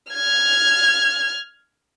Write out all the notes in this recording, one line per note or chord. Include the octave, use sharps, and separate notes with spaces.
F6 G#6